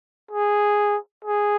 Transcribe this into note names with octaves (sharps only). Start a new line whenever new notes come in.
G#4
G#4